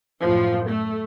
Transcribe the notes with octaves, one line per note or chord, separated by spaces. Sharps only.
F#2 A2 F3
A3